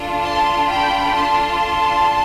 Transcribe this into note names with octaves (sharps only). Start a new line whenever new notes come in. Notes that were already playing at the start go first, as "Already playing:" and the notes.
Already playing: D4 F4 A4
A5 C6
G5 B5
A5 C6